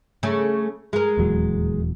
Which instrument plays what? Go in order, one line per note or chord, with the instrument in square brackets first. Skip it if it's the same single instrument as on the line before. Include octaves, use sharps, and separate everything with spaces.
[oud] C#3 A3
G#3 A#4
[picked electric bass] D#1 E2 F#3